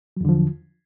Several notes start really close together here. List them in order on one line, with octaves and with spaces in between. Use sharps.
F#3 E2 D3 F3